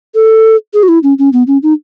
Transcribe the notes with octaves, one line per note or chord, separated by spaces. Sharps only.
A4
G#4
F#4
E4
C#4
C#4
B3
C#4
D#4